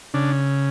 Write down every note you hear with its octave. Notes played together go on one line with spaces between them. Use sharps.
C#3 D4